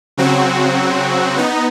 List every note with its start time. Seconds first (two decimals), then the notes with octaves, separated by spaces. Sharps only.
0.17 C#3 F#3 C4 F#4
1.37 B3 D#4